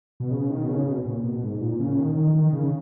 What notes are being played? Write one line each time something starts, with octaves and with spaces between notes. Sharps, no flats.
B2
C#3
D#3
B2
C#3
B2
A#2
B2
G#2
A#2
C#3
D#3
D#3
D#3
C#3